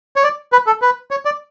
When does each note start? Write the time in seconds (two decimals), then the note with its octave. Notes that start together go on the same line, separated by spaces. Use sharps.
0.16 C#5
0.24 D5
0.52 B4
0.67 A4
0.82 B4
1.11 C#5
1.25 D5